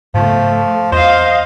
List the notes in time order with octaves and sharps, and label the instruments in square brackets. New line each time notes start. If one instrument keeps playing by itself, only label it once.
[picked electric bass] G#2 C#3 B3 [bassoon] F3 [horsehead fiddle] A3
[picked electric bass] E2 [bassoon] C5 [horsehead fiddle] D#5 F5